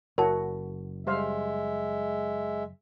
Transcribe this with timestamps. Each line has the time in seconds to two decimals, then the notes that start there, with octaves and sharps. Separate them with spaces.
0.18 F#1 E4 F#4 A#4 C#5 A5
1.07 G3 G#3 C5 E5 F5